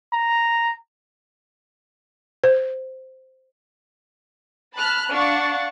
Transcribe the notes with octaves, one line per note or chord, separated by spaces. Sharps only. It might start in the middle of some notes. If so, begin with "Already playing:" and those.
A#5
C5
A5 B5 F6 F#6
D4 F5 F#5 C#6 A6